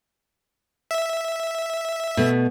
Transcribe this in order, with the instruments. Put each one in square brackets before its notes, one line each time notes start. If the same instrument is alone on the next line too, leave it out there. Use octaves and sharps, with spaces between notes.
[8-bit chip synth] E5
[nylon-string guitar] B2 A3